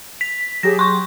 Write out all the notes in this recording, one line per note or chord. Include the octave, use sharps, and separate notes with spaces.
B6
F#3 G4 G#4 A#6
C6 C#6